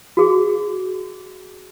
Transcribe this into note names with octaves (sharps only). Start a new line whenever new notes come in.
F#4 G#4